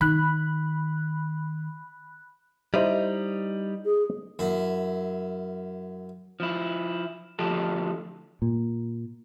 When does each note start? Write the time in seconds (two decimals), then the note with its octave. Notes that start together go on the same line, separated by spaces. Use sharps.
0.01 D#3 B5 F#6
2.74 G3 D#4 E4 C5 D#5
3.85 G#4
4.39 F#2 E4
6.40 F3 E4
7.39 D2 F3 G4 A4
8.42 A#2